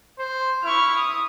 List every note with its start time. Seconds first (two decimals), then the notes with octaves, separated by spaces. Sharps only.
0.19 C5
0.64 E4 C#6 F6
0.96 D#6